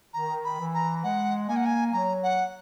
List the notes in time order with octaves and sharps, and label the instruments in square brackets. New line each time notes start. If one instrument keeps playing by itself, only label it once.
[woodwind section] D#3 [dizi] A#5
[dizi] B5
[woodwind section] E3
[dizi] A#5
[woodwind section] G#3 [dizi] F#5
[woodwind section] A#3 [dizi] G#5
[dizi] F#5
G#5
[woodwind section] F#3 [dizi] A#5
[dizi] F#5